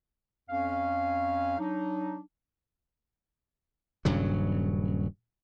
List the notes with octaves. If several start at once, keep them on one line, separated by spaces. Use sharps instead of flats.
F2 C#4 F5
F#3 D4 D#4
D#1 G2 C#3 F#3